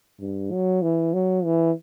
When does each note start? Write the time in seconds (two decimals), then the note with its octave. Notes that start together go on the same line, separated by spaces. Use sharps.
0.21 G2
0.51 F#3
0.82 E3
1.14 F#3
1.45 E3